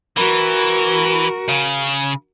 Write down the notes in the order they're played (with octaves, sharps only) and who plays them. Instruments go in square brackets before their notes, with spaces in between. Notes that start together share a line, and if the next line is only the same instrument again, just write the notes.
[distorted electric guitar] E3 [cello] F#4 A#4
[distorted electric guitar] C#3